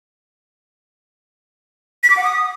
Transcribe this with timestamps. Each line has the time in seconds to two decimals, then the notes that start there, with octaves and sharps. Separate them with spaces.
2.03 B6
2.10 D6
2.17 F#5
2.24 D#6